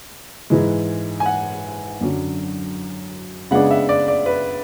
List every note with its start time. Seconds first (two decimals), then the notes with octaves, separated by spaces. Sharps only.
0.50 G#2 E3 G#3
1.20 G#5
1.26 F#5
2.01 F#2 D3 F#3
3.51 C#3 G#3 B3 D4 F#5
3.71 E5
3.89 D5
4.08 D5
4.26 B4